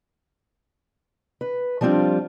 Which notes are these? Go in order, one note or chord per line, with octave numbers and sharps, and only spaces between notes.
B4
F3 G3 C4 D4 F4